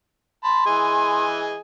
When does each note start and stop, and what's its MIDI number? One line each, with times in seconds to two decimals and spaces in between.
0.44 0.63 81
0.44 0.63 83
0.44 1.25 84
0.66 1.58 52
0.66 1.58 68
0.66 1.58 75